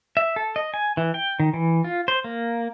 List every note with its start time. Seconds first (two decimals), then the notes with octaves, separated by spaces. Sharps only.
0.17 E5
0.36 A4
0.56 D#5
0.74 G#5
0.97 E3
1.14 G5
1.40 D#3
1.54 E3
1.84 F4
2.08 C5
2.24 A#3